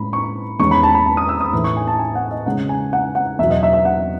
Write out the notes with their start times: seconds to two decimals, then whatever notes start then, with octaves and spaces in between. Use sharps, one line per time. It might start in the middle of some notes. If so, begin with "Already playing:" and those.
Already playing: A2 G#3 C#4 B5
0.13 C#6
0.59 E2 D#3 G#3 C#4 C#6
0.71 B5
0.83 A5
0.95 B5
1.06 A5
1.17 D#6
1.29 E6
1.41 D#6
1.53 A2 E3 A3 D#6
1.64 C#6
1.77 G#5
1.87 A5
1.99 G#5
2.15 F#5
2.31 D#5
2.46 C#3 G#3 C#4 F#5
2.69 G#5
2.93 F#5
3.15 F#5
3.39 E2 B2 F#3 E5
3.50 D#5
3.63 E5
3.73 E5
3.85 F#5